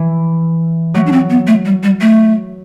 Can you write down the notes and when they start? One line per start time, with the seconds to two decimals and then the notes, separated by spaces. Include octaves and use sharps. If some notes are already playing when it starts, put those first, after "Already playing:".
Already playing: E3
0.94 F#3 A3
1.07 D4
1.12 C4
1.30 B3
1.47 A3
1.65 G3
1.83 G3
2.01 A3